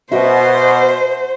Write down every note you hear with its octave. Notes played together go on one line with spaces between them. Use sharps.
B2 F#4 C5 D#5 E5